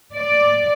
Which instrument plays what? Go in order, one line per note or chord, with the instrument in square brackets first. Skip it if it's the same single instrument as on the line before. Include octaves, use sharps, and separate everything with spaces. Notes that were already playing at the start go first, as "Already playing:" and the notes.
[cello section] D5